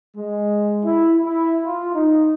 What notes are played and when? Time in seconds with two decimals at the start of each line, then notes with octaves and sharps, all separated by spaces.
0.17 G#3
0.85 E4
1.24 E4
1.66 F4
1.95 D#4